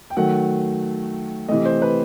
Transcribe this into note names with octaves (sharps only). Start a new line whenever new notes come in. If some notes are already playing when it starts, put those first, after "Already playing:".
G5
D#3 F#3 A3 F#5
C3 E3 A3 D#5
C5
B4